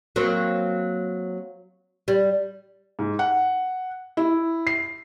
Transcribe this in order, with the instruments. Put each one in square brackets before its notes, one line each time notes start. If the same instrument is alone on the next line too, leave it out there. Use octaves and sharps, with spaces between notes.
[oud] F#3 A#3 C4
G3
[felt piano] G#2
F#5
E4
C7